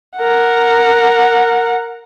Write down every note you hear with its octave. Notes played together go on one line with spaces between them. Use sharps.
A#4 F#5